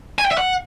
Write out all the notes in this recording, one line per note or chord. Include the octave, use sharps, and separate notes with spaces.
G#5
G5
E5
F#5